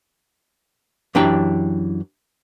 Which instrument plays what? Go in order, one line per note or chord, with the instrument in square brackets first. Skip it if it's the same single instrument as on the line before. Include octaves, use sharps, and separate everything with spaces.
[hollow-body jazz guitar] F#2 E3 D4 G4 G5 A#5